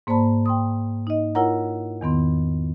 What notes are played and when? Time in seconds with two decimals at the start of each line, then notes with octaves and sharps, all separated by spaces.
0.07 G#2 A#3 C5 D5 A5 B5
0.46 G5 C6 D#6
1.07 D#4 D#5
1.35 E4 F4 A#4 C#5 F#5 A#5
2.01 E2 D#3 B3 C6